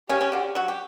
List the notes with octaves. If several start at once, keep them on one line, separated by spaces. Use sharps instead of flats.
C#3 C#4 G4
C#3 C#4
D3 D4
F#3 F#4
G4